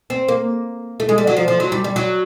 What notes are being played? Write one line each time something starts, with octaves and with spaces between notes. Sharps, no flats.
C4
A#3
A3
G#3
G3
F#3
F3
F3
F#3
G3
G3
F#3